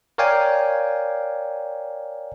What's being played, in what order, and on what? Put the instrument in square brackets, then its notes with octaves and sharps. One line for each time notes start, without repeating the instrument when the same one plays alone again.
[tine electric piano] A#4 C#5 D5 F5 G5 G#5